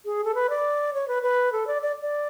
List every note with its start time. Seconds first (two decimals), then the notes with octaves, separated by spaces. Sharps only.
0.05 G#4
0.24 A4
0.35 B4
0.50 D5
0.94 C#5
1.08 B4
1.23 B4
1.52 A4
1.67 D5
1.82 D5
2.02 D5